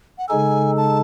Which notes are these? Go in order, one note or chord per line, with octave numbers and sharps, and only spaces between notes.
F#5
C#3 G#3 D#4 A4 G#5
A5